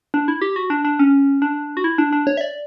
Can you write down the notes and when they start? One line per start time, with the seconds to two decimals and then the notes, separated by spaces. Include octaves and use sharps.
0.14 D4
0.28 E4
0.42 G4
0.56 F#4
0.70 D4
0.85 D4
0.99 C#4
1.42 D4
1.77 F#4
1.84 E4
1.98 D4
2.12 D4
2.27 C#5
2.37 E5
2.41 D5